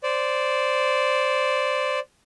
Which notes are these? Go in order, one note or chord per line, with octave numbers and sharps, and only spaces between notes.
C5 D5